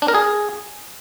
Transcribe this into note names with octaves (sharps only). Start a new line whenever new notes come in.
D4
A#4
G#4